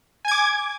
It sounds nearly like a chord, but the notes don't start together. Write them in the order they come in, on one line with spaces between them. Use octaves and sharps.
G#5 G#6 D6